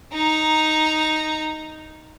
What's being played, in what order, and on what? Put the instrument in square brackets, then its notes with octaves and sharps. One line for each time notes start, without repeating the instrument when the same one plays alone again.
[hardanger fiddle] D#4 A#5